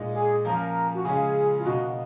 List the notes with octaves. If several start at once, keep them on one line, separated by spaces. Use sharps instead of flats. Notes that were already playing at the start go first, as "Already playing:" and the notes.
Already playing: A#2 G#3 D#4
G#4
F3 A#3 C#4 F4 A#4
F#4
C#3 G#3 C#4 F4 G#4
F4
B2 A#3 D#4 F#4